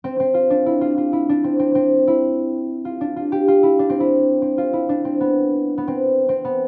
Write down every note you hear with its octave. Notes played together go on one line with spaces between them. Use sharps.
C4
C4
F4
D4
E4
F4
F4
E4
D4
C4
C4
C4
E4
F4
D4
F4
G4
F4
E4
D4
C4
E4
C4
F4
E4
D4
C4
B3
B3
C4
C4
B3